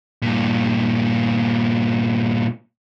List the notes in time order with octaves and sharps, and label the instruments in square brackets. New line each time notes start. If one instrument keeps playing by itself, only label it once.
[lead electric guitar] G2 A#2